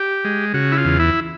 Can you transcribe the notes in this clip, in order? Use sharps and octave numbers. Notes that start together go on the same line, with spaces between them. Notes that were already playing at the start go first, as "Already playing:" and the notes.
Already playing: G4
G#3
C#3 F#4
E4
F4
E2
E4